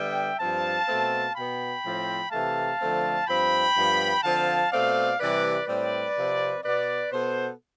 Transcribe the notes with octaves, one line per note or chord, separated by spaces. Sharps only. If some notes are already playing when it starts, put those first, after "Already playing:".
Already playing: D3 G3 B3 E5 G5
G2 F3 C4 F5 A5
B2 A3 C4
B2 B3 G5 B5
A2 F3 C4
C3 E3 A3 F5 A5
D3 F3 A3 C4
G2 F3 C4 G5 B5
G2 F3 B3
D3 F3 C4 F5 A5
B2 A3 C4 D5 F5
C3 E3 G3 B4 D5
A2 G3 C4 B4 D5
C3 F3 C4
B2 B3 B4 D5
B2 B3 A4 C5